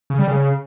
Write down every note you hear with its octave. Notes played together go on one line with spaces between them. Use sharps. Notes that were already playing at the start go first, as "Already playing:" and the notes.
C#3
G3
C#3